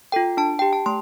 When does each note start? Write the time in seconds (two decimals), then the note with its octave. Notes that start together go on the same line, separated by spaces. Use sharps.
0.12 F4 A4 G5
0.37 D4 A5
0.59 G4 G5
0.73 A5
0.86 A3 C6